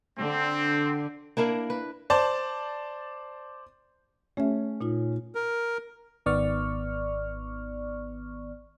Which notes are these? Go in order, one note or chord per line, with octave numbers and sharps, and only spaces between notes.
D3 C4
A#3 D4 E4 A#4
B4
C5 D5 A5
A3 C#4 G#4 E5
A#2 D#4 F4
A#4
G#1 D#3 B3 D5 C#6 F6